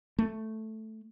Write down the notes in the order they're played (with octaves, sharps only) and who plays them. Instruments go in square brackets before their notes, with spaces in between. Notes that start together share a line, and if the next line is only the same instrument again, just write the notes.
[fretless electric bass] A3